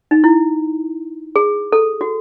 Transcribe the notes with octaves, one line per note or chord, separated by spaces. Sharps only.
D#4
E4
G#4
A4
F#4